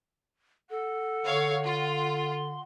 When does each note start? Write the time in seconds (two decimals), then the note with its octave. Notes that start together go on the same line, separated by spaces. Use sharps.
0.70 A4 F#5
1.25 D3 C#5 F5
1.66 F4 C6